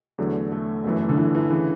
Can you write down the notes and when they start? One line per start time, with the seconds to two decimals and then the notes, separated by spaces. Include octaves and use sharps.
0.18 E2 D3 F#3 A3
0.52 A3
0.84 G1 F#2 E3 A3
1.09 D3
1.17 E3
1.35 E3
1.51 C#3 E3